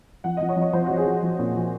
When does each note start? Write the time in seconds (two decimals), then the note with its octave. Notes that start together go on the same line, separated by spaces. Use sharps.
0.24 F3 F#5
0.37 F3 D#5
0.49 C#5
0.56 F3
0.62 C#5
0.73 F3 C5
0.86 F3 F#4
0.97 G#4
1.05 F3
1.23 F3
1.39 A#2
1.54 F3